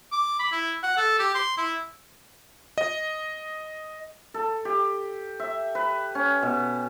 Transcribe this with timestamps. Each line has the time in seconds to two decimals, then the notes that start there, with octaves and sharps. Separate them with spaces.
0.12 D6
0.39 B5
0.52 E4
0.83 F#5
0.97 A4
1.19 G4
1.34 C6
1.57 E4
2.78 D#5
4.34 A4
4.65 G4
5.40 E5
5.75 B4
6.15 C#4
6.43 B2